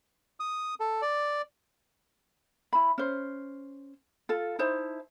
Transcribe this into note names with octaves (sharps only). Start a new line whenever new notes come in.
D#6
A4
D5
E4 B5
C#4 C5
F4 A4
D#4 E4 C5 A5